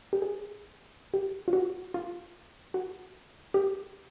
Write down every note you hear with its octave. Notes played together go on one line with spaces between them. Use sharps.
G4
G#4
G4
F4
F#4
F4
F#4
G4